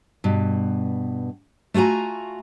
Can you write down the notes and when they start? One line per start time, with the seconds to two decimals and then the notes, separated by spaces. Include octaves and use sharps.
0.24 G2 B2
1.74 A3 F4 F#4 G#5 A#5